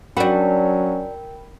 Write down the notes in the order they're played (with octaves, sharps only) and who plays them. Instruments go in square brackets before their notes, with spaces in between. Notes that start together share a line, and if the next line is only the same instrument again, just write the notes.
[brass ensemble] F#3 C#4 [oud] D4 F#4 [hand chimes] A#4 G5 B5